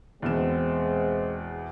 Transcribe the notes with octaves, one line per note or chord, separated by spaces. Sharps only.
E2 B2 G#3 C4 E7